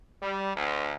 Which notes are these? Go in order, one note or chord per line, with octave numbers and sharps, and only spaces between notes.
G3
D2